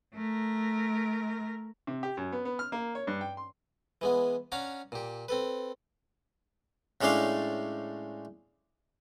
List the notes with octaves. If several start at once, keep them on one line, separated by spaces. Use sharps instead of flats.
A3 A#4
C3
G4
F#2
B3
B3
F6
A#3
C#5
G2
G5
C6
E3 G#3 B3
C#4 D4 C#5 F5 F#5 A#5
A#2 G4
C4 A4 B4
A2 G#3 A3 C#4 D4 F5